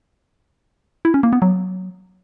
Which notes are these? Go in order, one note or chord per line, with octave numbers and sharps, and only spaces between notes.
E4
C#4
A#3
B3
F#3